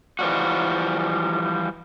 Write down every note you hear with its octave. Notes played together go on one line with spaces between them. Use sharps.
E3 F3 G3 F#4